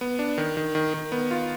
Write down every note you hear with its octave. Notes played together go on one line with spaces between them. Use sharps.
B3
D4
D#3
D#3
D#3
D#3
B3
F4